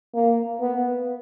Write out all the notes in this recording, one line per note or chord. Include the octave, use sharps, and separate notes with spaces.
A#3
B3